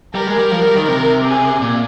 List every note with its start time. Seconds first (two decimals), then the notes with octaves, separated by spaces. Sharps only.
0.15 G3 A#4
0.27 G#3
0.39 G3
0.51 F3
0.64 G3
0.76 D#3
0.88 C3
1.25 G#4
1.61 A#2